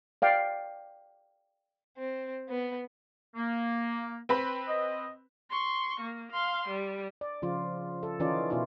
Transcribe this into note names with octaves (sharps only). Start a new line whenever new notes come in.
D5 F5 G5
C4
B3
A#3
C4 B4 B5
D#5
C6 C#6
A#3
F5 C6
G3
D5
C#3 F3 F4
A4
D#3 E3 C#4 D#4 F4 D5
B2 E4 F4 D5